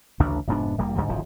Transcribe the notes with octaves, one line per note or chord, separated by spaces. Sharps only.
A1 D2 C#3 D4
F1 G#2 B3 D4
E1 G3 A#3
D2 G#2 D3 G3
D1 G#1 C#3 F3